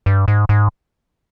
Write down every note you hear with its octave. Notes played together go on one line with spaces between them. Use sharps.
G2
G#2
G#2